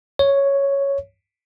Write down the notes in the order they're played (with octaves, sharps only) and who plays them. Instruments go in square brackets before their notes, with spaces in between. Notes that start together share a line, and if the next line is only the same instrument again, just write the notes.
[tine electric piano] C#5